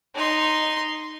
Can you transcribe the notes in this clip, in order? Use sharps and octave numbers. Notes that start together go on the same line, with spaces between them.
D#4 C6